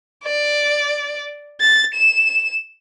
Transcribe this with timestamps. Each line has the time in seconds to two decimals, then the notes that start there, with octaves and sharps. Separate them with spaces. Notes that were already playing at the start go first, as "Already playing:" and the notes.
0.24 D5
1.61 A6
1.94 E7